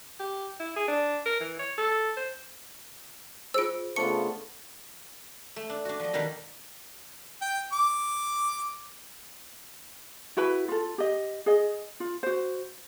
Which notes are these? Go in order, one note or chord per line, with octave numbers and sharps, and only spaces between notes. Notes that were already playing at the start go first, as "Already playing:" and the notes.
G4
E4
G#4
D4
A#4
E3
C#5
A4
C5
F4 G#4 C5 E6 D7
C#3 A3 B3 D4 F4 C5 C#6 C#7
A3
D4
D4 F#4
F3 D#5
B2 D#3 G3 D4 G4
G5
D6
E4 F#4 B4 B5
F4 A4
G4 D#5
G#4 D#5
F4
F#4 C5